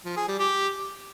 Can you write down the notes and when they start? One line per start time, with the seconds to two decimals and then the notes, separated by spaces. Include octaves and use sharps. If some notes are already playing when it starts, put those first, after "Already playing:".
0.05 F3
0.17 G#4
0.28 G3
0.39 G4